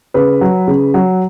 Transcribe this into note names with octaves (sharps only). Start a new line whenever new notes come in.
C#3 B4
F#3
C#3
F#3